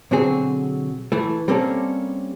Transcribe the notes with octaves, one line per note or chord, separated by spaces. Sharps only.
B2 D3 F#3 C4 G#4
E3 A3
G3 A#3 C4 C#4 A4